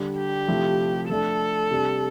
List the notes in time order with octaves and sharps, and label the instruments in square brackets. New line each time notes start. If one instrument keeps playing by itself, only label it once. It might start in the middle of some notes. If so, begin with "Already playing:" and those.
Already playing: [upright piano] D3 G3 D4
[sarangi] G4
[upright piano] C3 F3 A3 E4
[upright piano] F3 A3 D4 [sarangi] A4
[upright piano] C3 G3 D4